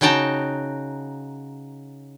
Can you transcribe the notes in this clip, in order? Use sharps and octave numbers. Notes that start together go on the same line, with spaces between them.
C#3 D#4 F#4 G5 A5 A#5